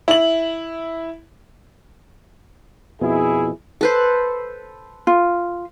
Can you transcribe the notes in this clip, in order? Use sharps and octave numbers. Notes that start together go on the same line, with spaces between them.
E4 F#7
F2 B2 E4 G#4
A4 B4 C5
F4